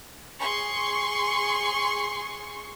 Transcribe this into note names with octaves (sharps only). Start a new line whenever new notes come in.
G#4 C6 C#6